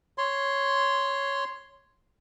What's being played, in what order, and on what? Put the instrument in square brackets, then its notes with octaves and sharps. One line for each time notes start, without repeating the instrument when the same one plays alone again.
[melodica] C#5 C6